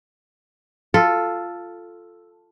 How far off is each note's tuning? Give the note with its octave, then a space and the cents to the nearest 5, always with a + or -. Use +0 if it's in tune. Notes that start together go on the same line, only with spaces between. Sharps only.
F4 +0 A4 +0